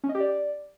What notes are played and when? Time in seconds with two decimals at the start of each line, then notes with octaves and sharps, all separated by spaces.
0.04 C#4
0.09 D#5
0.15 G4
0.20 D5